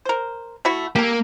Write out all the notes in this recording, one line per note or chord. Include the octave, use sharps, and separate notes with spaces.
A#4 C5
A3 E4 F#4
A#3 G4 A4